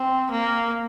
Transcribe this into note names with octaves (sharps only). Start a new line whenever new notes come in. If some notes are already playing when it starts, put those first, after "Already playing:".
Already playing: C4
A#3